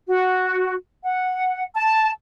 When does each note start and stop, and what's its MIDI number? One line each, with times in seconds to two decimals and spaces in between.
0.08 0.75 66
1.03 1.64 78
1.75 2.10 81